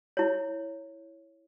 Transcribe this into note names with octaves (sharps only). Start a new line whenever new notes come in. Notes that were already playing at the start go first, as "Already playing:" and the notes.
E4 C#5